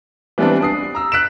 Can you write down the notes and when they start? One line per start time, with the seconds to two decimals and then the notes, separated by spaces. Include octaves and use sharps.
0.38 E3 G3 G#3 B3 C4 D4
0.61 D4 D#6 C7
0.95 A#5 E6
1.12 F#6 B6 D7 E7